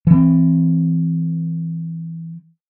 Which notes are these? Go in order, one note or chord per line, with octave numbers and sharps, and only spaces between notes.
E3 C4